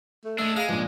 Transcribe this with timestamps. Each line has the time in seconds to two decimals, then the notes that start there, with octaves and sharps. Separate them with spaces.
0.24 A3
0.38 G#3 A3 D4 E5
0.56 G#3 G#4 F5 A#5
0.69 C#2 A#2 F3 D4